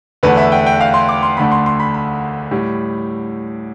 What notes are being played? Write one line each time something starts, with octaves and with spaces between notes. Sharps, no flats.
E2 D3 A3 B4
E5
G5
G5
F5
C6
D6
C6
D2 D3 A3 B5
C6
C6
B5
B5
A2 G3